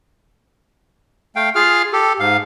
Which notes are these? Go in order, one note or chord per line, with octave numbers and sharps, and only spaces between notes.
A3 F5 G5
F4 G#4 F5 F6
G4 A4
G#2 F5